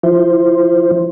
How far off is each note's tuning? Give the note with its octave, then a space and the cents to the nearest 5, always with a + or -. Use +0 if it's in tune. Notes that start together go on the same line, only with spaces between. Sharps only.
F3 +0 E4 +20 C5 +0